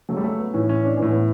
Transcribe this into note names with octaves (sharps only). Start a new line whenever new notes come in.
C#3 F#3 A3
G3
A3
B3
A2 E3 C#4
C#4
D4
A2 E3 C#4
B3